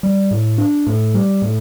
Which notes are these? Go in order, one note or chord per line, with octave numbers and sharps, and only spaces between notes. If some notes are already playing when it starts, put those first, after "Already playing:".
G3
A2
D4
A2
G3
A2